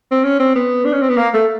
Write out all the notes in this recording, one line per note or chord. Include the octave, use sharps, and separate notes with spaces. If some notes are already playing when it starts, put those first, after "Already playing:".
C4
C#4
C4
B3
D4
C#4
C4
B3
A#3
A3